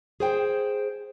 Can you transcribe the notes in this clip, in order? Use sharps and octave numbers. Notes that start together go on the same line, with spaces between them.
G#4 C5 G5